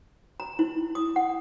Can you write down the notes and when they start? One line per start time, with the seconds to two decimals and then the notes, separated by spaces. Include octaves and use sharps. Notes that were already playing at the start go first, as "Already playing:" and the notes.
0.40 A#5
0.59 E4
0.95 D#6
1.16 F#5